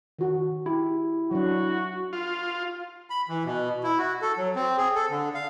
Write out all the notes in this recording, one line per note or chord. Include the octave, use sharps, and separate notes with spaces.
D#3 F#4
E4 G4
F#3 D4 F#4
F4
B5
E3
B2
E4
F#4
A4
F#3
C4
G#4
A4
D3
F5